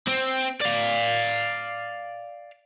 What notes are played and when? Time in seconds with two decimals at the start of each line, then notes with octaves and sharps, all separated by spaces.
0.08 C4
0.62 D5 F5